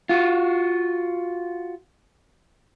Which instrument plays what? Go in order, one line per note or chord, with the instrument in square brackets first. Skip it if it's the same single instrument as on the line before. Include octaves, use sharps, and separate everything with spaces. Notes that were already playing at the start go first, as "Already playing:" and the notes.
[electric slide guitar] F4 F#4